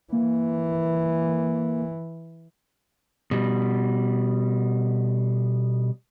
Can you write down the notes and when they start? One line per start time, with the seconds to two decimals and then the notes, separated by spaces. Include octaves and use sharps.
0.13 E3 A#3
3.31 B2 G3